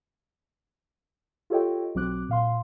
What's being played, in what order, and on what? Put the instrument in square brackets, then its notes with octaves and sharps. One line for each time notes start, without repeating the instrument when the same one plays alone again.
[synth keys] F4 G4 A4 C#5 D#5 G5
B1 F#3 C4 D6 F#6
A#2 F5 C6